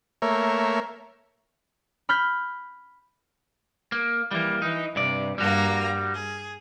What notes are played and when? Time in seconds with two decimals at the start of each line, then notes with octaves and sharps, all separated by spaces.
0.22 A3 A#3 A#4 C#5 E5
2.09 B5 F6 G6 B6
3.92 A#3
4.31 E3 G3 A#3
4.62 E3 D#4
4.96 G2 C3 D5
5.38 G2 G3 A#3 F#4 A#5
6.13 G#4